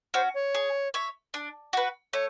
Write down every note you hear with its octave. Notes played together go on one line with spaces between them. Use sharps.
C#4 F#4 C5
C#5
G#4
C#5 E5
D4
F#4 B4
A3 C#5